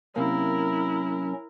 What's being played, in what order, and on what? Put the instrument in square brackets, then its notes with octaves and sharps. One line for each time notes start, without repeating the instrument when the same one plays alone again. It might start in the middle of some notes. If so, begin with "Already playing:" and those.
[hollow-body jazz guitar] C3 A#3 [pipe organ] F#3 C#4 [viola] E4 A#4